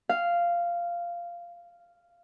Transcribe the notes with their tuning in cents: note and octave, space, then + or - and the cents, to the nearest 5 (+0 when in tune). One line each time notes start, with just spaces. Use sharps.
F5 -10